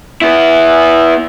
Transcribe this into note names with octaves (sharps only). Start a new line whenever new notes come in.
B3 E4